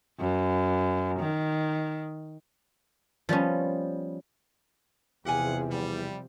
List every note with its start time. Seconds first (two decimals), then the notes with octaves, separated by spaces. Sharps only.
0.19 F#2
1.19 D#3
3.29 F3 G3 B3 C#4
5.25 E2 C3 F3 G4 G#4 F5 F#5 G#5
5.70 G3